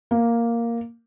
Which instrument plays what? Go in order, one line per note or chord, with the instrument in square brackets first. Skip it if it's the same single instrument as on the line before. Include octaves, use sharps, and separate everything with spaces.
[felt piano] A#3